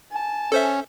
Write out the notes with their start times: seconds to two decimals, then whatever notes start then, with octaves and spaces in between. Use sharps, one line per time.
0.12 G#5 A5
0.52 C#4 A4 C5 E5